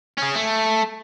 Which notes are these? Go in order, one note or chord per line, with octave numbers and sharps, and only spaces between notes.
C#4 G#4
A3